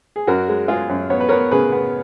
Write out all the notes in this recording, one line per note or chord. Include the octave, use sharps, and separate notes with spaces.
G#4
F#2 F#4 A#4
G#3
G#3 F4 G#4
F#2
B3 C#5
B4
B3 A#4 C#5
C#3 G#4 B4
B3